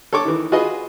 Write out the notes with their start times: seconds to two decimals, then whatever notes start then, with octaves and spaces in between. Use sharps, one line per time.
0.13 A4 C#5 C#6 D6
0.25 D#3 E3
0.52 F4 F#4 G#4 B4 D#5